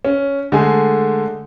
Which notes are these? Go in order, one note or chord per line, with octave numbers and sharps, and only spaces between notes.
C#4
D3 G#3 A3 G#5